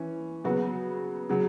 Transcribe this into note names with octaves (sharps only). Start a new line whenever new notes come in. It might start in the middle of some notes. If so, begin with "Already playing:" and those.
Already playing: E3 C#4
C#3 F#3 B3 F#4
C#3 F#3